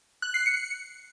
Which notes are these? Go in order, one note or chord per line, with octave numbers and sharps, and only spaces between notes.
F#6
C7
C#7